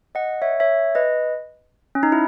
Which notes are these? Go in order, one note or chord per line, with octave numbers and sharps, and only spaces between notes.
D#5 F#5
C#5 E5
C#5 E5
B4 D#5
C#4
D#4
E4